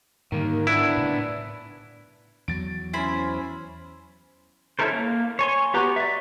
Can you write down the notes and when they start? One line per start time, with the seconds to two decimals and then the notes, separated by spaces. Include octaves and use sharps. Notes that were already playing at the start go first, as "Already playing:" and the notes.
0.32 G#2 D3 D#3 G3 A#3
0.67 B3 D4 E4 B4
0.97 A2 C#3
2.48 E2 F#3 A6 D7
2.94 C#4 E4 C5 G#5 B5
4.79 C#4 E4 A4 A#4 C5
4.93 A#3
5.39 C#5 G#5 C6
5.74 B3 F#4 G4 B4 A#5
5.96 D5 E5